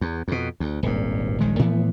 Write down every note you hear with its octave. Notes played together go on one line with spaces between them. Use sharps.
E2
F2 B2
D2
D#1 G#1 G2
D#1 A#1 D#3 G#3
A2 E3 F3 B3